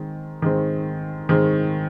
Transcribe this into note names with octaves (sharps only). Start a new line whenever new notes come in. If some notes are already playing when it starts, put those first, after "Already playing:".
Already playing: D#3 G#3 C4
D#3 G#3 C4
D#3 G#3 C4